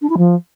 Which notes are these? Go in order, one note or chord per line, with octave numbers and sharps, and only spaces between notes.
D4
E4
F3